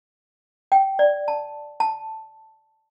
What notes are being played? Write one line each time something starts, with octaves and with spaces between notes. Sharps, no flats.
G5
D5
A5
A5